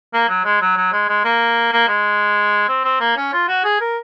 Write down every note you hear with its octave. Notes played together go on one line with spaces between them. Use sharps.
A#3
F#3
G#3
F#3
F#3
G#3
G#3
A#3
A#3
G#3
C4
C4
A#3
C#4
F4
F#4
G#4
A#4